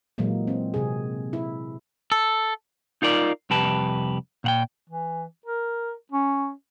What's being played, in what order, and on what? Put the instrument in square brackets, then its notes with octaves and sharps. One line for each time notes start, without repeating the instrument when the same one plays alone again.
[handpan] A#2 E3 F#3 G#3 A#3
C4
C3 G#4
E4
[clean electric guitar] A4
D#4 F4 A#4 D5
C2 F2 G4 B4 A5
A#2 F#5 G5
[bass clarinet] E3
A#4
C#4